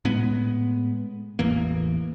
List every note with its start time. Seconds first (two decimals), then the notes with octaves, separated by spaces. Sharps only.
0.05 A2 G#3 B3
1.39 A1 E2 E3 A#3